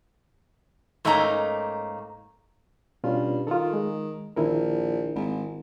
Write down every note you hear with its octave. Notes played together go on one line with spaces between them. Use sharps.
G#2 A3 A#3 C#4 D#4 A#5
G2 B2 C#4 F4
D#3 F4 A4
G#3
A#1 D#3 E4 A#4
G#1